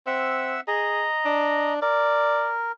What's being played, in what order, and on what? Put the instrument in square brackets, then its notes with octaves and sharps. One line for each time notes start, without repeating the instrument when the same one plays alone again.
[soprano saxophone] C4 [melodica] E5 F#5 E6
[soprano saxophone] G#4 [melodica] D#5 A#5
[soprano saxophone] D4
[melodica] A#4 [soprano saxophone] D5